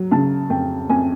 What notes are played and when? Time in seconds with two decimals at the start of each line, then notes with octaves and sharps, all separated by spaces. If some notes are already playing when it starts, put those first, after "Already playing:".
Already playing: F#3
0.11 C#3 A5
0.50 F2 G5
0.89 F2 G#5